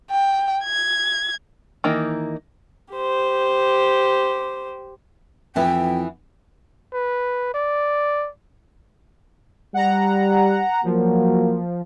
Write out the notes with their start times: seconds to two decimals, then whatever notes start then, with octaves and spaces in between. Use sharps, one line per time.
0.11 G5
0.65 G#6
1.84 D#3 E3 A#3 D#4
2.94 G4 C5
5.56 F2 E3 B3 E4 G5
6.93 B4
7.54 D5
9.74 G3 F#5 A#5
10.84 F3 F#3 A#3